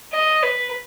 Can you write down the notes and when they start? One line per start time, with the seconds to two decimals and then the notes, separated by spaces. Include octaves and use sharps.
0.13 D#5
0.43 B4